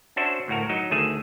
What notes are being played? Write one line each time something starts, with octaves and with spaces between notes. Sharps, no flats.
C#4 D4 F#4 C5 E5
D2 A2 F#4 A#4
F#3 D#4
D2 D#3 A3 G#4 E5